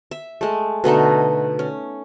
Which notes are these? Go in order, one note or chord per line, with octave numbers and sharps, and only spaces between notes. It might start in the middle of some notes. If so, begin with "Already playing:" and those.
E5
G#3 A3
B2 D3 A3 D#4
C#4